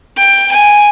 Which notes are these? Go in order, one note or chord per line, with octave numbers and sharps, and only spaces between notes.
G5
G#5